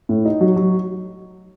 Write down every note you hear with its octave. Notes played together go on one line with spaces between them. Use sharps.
A2
D#4
F#3
F#3